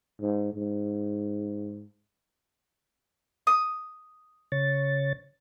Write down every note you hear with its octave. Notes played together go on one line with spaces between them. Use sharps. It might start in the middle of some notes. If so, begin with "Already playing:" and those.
G#2
G#2
D#6
C#3 C#5 A6